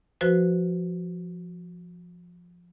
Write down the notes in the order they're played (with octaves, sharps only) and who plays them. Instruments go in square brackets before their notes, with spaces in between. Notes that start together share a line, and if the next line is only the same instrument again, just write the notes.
[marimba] F3 F#4 B4 C5